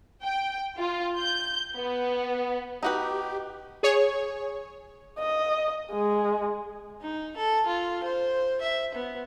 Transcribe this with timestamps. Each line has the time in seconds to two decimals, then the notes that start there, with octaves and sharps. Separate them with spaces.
0.22 G5
0.78 F4
1.18 G6
1.76 B3
2.83 D#4 F#4 G4 B4
3.83 G#4 C#5
5.20 D#5
5.92 G#3
7.02 D#4
7.37 A4
7.67 F4
8.03 C5
8.61 E5
8.95 B3